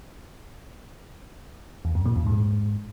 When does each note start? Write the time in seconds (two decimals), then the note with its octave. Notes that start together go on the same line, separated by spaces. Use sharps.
1.85 E2
1.95 F#2
2.06 A#2
2.16 E2
2.26 G#2